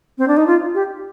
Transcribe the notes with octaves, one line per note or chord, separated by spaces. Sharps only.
C4
D4
D#4
F4
G4